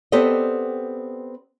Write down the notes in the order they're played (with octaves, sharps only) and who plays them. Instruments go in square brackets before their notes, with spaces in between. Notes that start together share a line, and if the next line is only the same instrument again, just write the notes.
[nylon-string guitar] B3 C4 G4 A4 D5 D#5